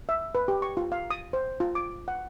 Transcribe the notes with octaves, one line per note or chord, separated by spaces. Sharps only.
E5
B4
G4
C#6
F4
F5
D#6
C5
F4
D6
F#5